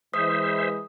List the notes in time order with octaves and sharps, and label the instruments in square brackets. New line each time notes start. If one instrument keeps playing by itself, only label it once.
[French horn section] E3 G#3 [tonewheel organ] C5 E5 [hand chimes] D#6